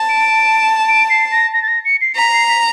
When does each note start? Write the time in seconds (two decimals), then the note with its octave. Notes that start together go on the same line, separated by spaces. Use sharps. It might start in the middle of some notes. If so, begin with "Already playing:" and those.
Already playing: A5
0.09 D7
0.88 D7
1.10 C7
1.32 A#6
1.53 A#6
1.62 A6
1.68 A#6
1.85 C#7
2.01 C7
2.16 A#5 B6
2.32 C7
2.48 B6